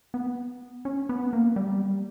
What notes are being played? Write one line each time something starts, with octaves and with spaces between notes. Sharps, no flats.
B3
C#4
B3
A#3
G3